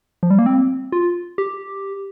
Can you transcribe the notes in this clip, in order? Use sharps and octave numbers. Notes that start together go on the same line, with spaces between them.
F3
G3
A#3
C4
F4
G4